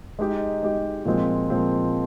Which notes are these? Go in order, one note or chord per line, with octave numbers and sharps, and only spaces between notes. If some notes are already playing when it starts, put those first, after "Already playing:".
G#3 D#4 G4
G#3 D#4 G4
A#2 F3 G#3 C4
A#2 F3 G#3 C4